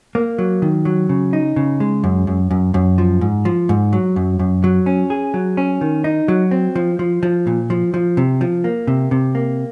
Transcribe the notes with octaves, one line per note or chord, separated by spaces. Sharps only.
A#3
F#3
D#3
F#3
C#3
D#4
C#3
G#3
F#2
F#2
F#2
F#2
F3
G#2
F3
G#2
F#3
F#2
F#2
F#3
C#4
G#4
F#3
C#4
D#3
D#4
F#3
C4
F3
F3
F3
A#2
F3
F3
C3
F3
A#3
C3
C3
A#3